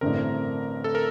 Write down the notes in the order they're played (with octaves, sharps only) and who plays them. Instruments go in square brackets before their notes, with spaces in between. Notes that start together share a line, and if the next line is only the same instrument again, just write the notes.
[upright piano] A1 G2 D3 A3 C4 [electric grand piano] A#4
[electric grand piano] A4
A#4